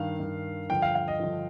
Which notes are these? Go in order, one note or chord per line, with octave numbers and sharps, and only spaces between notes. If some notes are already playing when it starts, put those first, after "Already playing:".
Already playing: G2 D#3 F5
G2 D#3
G2 D3 F3 G5
F5
F5
D#5
G2 D3 F3